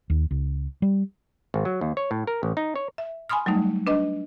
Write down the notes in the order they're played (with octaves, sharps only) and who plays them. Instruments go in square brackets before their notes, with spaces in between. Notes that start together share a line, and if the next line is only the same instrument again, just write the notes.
[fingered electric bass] D#2
C#2
G3
[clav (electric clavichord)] G#1
F#3
D#2
C#5
A2
A#4
A1
D#4
C#5
[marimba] E5
G#5 B5 C6 D#6 F6
F#3 G3 A3 D#4
D4 B4 D#5